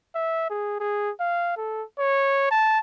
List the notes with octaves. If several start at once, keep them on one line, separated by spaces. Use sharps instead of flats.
E5
G#4
G#4
F5
A4
C#5
A5